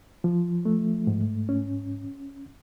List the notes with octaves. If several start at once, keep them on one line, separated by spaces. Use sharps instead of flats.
F3
A3
G#2
C#4